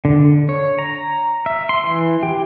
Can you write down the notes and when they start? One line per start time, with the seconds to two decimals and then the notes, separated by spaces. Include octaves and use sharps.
0.05 D3
0.49 C#5
0.79 A#5
1.46 E5
1.69 C6
1.84 E3
2.23 G4